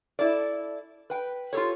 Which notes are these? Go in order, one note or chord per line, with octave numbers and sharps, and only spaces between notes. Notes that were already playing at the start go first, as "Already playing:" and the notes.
E4 A4 D5
B4 G5
F4 G4 A4 C#5